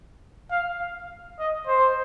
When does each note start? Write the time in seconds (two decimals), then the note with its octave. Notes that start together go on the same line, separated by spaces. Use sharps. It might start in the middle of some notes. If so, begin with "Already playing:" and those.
0.50 F5
1.39 D#5
1.67 C5